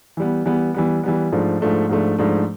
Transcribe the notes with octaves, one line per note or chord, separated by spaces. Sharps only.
E3 G3 B3
E3 G3 B3
E3 G3 B3
E3 G3 B3
G#2 F3 A3 D4
G#2 F3 A3 D4
G#2 F3 A3 D4
G#2 F3 A3 D4